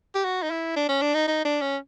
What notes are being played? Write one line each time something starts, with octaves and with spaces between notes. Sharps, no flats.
G4
F#4
D#4
E4
D4
C#4
D4
D#4
D#4
D4
C#4